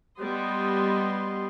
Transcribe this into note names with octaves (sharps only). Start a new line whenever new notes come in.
G3 B3 D#5 C6